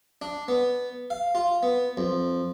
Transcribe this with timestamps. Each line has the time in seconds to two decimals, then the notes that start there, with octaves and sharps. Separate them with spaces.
0.22 D4
0.48 B3
1.10 F5
1.35 F4
1.63 B3
1.97 F2